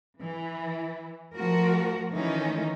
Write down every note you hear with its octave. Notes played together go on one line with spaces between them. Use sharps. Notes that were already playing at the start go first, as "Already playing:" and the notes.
E3
F3 A3 F#4 A#4
D#3 E3 A3 C#4 D#4